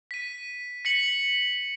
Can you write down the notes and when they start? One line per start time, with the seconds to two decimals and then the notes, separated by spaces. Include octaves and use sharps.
0.11 B6 D#7
0.85 B6 C#7 F#7